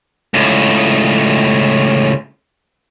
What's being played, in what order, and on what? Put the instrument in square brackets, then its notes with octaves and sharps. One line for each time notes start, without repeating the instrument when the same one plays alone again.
[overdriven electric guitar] C#2 A2